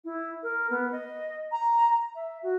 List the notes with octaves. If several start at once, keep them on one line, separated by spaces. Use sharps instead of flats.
E4
A#4
B3
D#5
A#5
E5
F#4